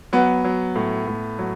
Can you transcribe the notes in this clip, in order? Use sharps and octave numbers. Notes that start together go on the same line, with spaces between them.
F#3 B3
F#3
A2
A2
F#3